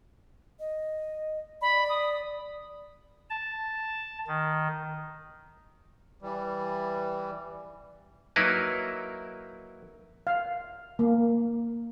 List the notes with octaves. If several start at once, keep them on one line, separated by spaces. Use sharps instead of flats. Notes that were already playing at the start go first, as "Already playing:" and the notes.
D#5
D5 B5
D#6
A5
D#3
E3 G3
F#3 A#3 D#4 E4 A#4 B4
F5
A#3